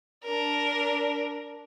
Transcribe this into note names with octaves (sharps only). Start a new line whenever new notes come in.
D4 A#4